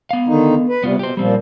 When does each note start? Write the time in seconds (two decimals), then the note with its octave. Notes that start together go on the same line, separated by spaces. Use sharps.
0.11 B3 F5
0.28 D3 D#3 D#4
0.69 B4
0.84 C3 G3 B3 F4
0.99 B2 G4 C5
1.17 A#2 F3 G3 C4